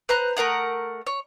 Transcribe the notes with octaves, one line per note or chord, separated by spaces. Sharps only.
B4 C5 A#5 F#6
A3 A#4 F#5 D#6
C#5